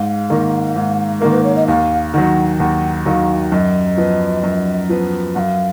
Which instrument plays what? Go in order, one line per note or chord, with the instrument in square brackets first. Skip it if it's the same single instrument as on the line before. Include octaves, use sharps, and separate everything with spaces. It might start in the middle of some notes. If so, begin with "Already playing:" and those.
Already playing: [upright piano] G#2 [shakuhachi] F5
[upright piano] D#3 A#3
G#2
[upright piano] D#3 A#3 [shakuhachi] A#4
[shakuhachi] B4
C#5
D#5
[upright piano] D#2 [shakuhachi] F5
[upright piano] D#3 F#3 [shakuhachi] F#5
[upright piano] D#2 [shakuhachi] F#5
[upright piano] D#3 F#3 [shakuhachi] F5
[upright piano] F#2 [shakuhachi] D#5
[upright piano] F3 B3
F#2
F3 B3
[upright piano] F#2 [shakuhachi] F5 F#5